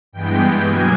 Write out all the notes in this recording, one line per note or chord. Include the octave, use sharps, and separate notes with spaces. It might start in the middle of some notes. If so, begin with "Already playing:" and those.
G2 E3 G#3 B3 G5
B2 F#3 A#3 G#5